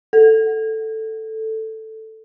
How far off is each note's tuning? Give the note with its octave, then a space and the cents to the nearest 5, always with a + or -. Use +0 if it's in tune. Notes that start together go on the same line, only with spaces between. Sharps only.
A4 +5